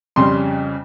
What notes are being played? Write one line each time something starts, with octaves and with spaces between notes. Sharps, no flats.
F2 C#3 G3 C#4 C6